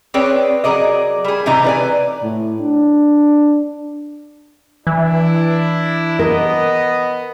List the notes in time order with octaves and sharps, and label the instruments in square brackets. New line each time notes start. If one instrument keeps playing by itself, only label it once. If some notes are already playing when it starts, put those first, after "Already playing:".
[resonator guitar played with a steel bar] C4 G#4 B4 C#5 D5 G5
F#3 G#4 A#4 D5 D#5
G3 G#4
A2 C3 E3 D#4 A#5
B4 D5 G#5
[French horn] A2
D4
[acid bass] E3 [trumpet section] D4 E4
[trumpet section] B3 D#5 [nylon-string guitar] A#4